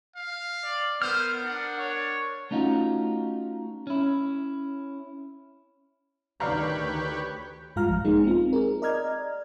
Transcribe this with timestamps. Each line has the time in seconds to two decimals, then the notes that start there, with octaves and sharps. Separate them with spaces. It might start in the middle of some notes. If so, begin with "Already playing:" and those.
0.16 F5
0.64 D5
1.02 B3 A#4 C5 F6
1.44 D4 F#5
1.79 C#5
2.51 A3 C#4 D#4 F4 F#4
3.87 C#4 E4
6.40 D2 D#3 G4 B4 C#5 D5 F5 A#5
7.76 G2 G#3 F4 F5 A#5 F6
7.88 A#1 F3
8.05 G#3 A#3 B3 D#4 G#4
8.24 C4 F4
8.53 D#4 G#4 A#4
8.82 D5 D#5 A#5 F6 G#6